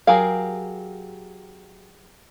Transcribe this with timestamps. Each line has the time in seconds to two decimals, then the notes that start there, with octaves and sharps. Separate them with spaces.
0.07 F#3 G4 G#4 A#4 F5